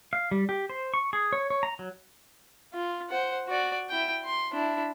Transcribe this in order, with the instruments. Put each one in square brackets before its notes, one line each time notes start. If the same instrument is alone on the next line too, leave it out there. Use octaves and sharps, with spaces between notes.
[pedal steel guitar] F5
G3
G4
C5
C#6
G#4
C#5
C#5
A#5
F#3
[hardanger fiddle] F4
C5 F#5
F#4 D5
E4 G5
C6
D4 E4